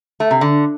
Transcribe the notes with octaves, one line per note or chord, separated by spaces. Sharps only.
A3
C3
D3